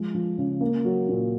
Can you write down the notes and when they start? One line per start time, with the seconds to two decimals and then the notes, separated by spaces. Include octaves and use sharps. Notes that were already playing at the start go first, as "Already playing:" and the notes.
Already playing: F3 G#3
0.14 F3
0.38 C#3
0.61 A#3
0.84 F#3
1.09 A#2